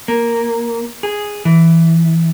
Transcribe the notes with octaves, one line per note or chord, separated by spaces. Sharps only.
A#3
G#4
E3